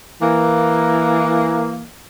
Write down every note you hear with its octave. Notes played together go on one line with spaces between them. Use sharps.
E3 A#3